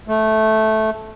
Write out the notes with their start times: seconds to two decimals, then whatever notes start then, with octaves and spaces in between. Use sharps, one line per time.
0.08 A3